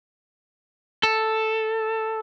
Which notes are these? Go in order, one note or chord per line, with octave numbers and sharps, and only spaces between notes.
A4